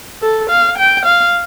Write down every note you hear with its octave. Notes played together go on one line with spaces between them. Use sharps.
A4
F5
G5
F5